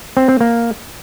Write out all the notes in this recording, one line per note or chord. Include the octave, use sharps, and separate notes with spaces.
C4
C4
A#3